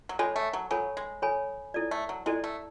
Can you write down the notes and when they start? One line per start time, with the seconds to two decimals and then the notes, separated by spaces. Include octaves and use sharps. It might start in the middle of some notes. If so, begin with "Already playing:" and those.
0.09 F#3
0.19 G#3 A4 C#5 G#5 B5
0.36 A3
0.53 F#3
0.71 F#3 A4 C#5 G#5 B5
0.97 G#3
1.22 A4 C#5 G#5 B5
1.74 E4 A4 D5
1.91 A3
2.09 F#3
2.26 G#3 E4 A4 D5
2.44 A3